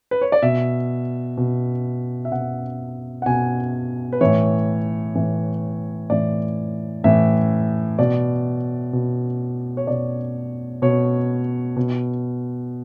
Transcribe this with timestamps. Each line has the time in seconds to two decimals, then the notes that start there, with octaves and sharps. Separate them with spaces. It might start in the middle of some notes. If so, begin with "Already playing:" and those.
0.11 B4
0.21 C#5
0.32 D5
0.42 B2 E5
1.38 B2
2.25 E5
2.32 B2 F#5
3.22 F#5
3.26 B2 G#5
4.13 B4
4.21 A2 E3 C#5
5.15 A2 E3
6.10 A2 E3 D5
7.04 A2 E3 E5
7.98 B2 D5
8.93 B2
9.77 C#5
9.87 B2 D5
10.82 B2 C#5
11.77 B2